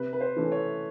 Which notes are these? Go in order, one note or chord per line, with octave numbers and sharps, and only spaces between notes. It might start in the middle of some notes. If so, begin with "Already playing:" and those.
Already playing: C3 B4
B4
C5
E3 A3 C#4
C#5